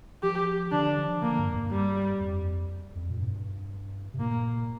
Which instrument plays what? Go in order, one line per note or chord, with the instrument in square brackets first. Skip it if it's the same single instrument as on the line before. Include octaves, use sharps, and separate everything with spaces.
[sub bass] F3 [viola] G4
[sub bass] D3 [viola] D4
[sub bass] F3
[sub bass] D3 [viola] A#3
[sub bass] G2
F2
G2
[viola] G3
[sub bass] F2
F2
A#2
G2
C3
[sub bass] A#2 [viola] A#3